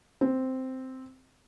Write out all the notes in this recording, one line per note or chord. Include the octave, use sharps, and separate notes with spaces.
C4